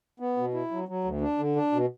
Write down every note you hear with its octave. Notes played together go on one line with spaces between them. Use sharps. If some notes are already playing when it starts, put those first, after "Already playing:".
B3
B2
E4
F#3
F#3
D2
D4
D3
D4
B2